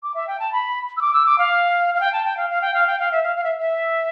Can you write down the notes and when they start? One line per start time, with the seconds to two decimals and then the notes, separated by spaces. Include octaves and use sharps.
0.03 D6
0.14 E5
0.28 G5
0.40 A5
0.53 B5
0.97 E6
1.01 D6
1.13 E6
1.26 D6
1.38 F5
1.95 F5
2.01 G5
2.13 A5
2.25 G5
2.37 F5
2.50 F5
2.62 G5
2.74 F5
2.87 G5
2.99 F5
3.12 E5
3.23 F5
3.36 F5
3.44 E5
3.59 E5